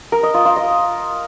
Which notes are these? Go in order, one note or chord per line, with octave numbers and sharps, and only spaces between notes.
A#4
D#5
F4
F4
D#5